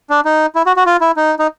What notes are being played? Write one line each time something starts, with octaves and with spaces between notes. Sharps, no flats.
D4
D#4
E4
F#4
F#4
F4
E4
D#4
D#4